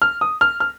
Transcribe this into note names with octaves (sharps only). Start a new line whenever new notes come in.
F6
D#6
F6
F6